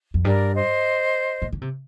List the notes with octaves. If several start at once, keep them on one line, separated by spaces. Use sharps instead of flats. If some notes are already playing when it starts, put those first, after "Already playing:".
F2
G2 A#4 D5
C5 D#5
A2
D3
C3